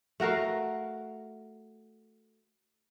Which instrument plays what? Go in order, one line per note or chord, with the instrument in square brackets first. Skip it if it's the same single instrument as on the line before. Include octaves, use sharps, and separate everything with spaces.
[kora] A3 F#4 A#4 F5